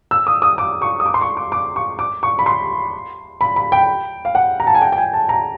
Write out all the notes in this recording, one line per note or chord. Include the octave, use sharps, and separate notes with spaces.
E6
D#6
D#6
D6
C#6
D#6
D6
C6
C#6
D6
D6
C#6
D6
C#6
B5
C6
B5
B5
G5
F5
F#5
A#5
A5
G#5
G5
G5
G#5
A5
A#5